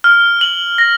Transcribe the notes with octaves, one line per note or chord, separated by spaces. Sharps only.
F6
F#7
A#6